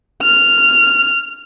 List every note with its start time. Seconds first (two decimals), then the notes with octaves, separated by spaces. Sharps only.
0.22 F6